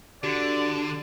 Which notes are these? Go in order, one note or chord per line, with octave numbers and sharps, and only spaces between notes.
D3 F#4 G4 D5